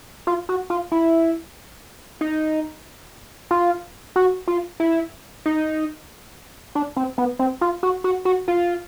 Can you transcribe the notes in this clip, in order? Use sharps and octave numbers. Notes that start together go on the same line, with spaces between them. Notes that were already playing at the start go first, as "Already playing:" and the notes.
F4
F#4
F4
E4
D#4
F4
F#4
F4
E4
D#4
D4
C4
B3
C4
F4
F#4
F#4
F#4
F4